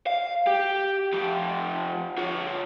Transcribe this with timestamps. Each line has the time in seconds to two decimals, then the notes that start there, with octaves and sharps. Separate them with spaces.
0.07 F5
0.47 G4
1.13 F3 G4
2.18 F4 C#5